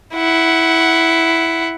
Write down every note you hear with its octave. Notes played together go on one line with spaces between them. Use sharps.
E4 F#5